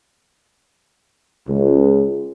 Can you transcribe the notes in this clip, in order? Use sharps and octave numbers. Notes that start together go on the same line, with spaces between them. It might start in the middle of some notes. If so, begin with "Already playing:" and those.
C#2